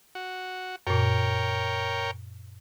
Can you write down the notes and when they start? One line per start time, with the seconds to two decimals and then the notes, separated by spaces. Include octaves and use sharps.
0.15 F#4
0.87 F#2 A#2 A#4 C#5 G5